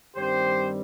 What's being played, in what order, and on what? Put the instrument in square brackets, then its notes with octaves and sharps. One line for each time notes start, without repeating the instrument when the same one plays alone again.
[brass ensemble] G2 D#3 G3 C4 G4 C5